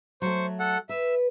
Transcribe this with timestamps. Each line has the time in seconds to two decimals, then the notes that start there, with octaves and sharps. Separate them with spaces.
0.22 F#3 A3 C5 C#6
0.59 A4 F#5
0.89 B4 E5